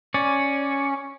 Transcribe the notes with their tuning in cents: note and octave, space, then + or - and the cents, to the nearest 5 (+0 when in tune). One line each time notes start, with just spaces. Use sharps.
C#4 +0 D5 +0